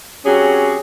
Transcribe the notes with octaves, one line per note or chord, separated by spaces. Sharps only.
F#3 C4 C#4 G4 G#4